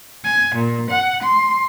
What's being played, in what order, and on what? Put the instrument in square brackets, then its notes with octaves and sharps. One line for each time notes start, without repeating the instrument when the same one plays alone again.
[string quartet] G#5
A#2
F#5
C6